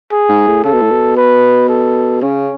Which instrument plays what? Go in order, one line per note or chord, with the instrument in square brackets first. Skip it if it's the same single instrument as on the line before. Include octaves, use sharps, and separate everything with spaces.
[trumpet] G#4
[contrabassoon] G#2
A2
[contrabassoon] C#3 [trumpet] A4
[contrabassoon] B2
A2
B2
[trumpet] B4
A4
[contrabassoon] C#3 [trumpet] C#4